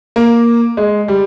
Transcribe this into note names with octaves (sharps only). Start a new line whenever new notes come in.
A#3
G#3
G3